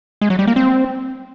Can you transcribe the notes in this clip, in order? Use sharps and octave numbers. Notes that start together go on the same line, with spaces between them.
G#3
F#3
G3
A#3
C4